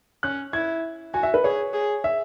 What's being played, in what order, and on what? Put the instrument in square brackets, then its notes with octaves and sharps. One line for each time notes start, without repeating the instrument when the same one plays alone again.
[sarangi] C#4 [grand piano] F#6
[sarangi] E4 [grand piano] G#6
[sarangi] F#4 [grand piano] G#5
[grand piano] E5
B4
[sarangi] G#4 [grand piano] C#5
[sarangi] G#4
[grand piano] E5